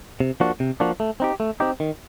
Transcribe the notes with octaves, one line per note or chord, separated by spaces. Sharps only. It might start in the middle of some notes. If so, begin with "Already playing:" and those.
C3
F3 A#3 D4 F#4
C3
F3 A#3 D4 F#4
A3
C4 D#4 G4
A3
C4 D#4 G4
D#3